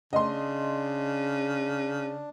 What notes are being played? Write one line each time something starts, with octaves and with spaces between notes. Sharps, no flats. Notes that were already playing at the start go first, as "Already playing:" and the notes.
C#3 D4 D#5 C6